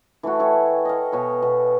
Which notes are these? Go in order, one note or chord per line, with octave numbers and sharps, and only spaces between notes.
E3 A3 E4 F#4
A4 C#5 G5 G#5
D#5 F5
B2 B4 C#5
B2